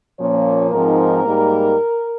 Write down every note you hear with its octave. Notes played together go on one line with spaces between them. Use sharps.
A#2 F3 A#3 C#4 C#5
G#2 F3 C4 D#4 A#4
G#2 G3 A#3 D#4